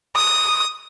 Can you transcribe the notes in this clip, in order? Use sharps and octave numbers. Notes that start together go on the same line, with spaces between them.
D#6